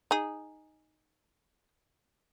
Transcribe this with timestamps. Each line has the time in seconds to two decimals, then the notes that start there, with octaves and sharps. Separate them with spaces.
0.11 D#4 G#4